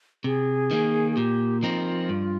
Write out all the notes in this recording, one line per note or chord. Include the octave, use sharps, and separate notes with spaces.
C3 G#4
D#3 A#3
G#4
A#2 G4
F3 C4 D#4 F4 A#4
G2